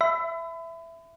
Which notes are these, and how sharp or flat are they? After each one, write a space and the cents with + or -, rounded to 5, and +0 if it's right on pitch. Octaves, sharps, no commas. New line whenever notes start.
E5 +10 B5 +35